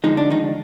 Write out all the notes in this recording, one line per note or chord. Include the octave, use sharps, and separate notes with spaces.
D2 D3 F3 G#3 D#4
D4
D#3 D#4